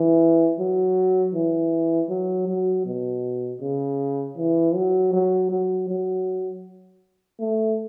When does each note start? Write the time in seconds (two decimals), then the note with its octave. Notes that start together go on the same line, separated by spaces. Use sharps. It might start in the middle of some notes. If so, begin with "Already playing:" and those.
Already playing: E3
0.59 F#3
1.35 E3
2.09 F#3
2.48 F#3
2.86 B2
3.61 C#3
4.38 E3
4.75 F#3
5.13 F#3
5.51 F#3
5.88 F#3
7.40 A3